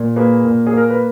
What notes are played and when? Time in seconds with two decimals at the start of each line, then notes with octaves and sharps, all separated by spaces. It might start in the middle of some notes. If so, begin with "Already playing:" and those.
Already playing: A#2
0.16 A#3 G#4 B4
0.45 A#2
0.67 G#4
0.73 A#3 A#4
0.90 B4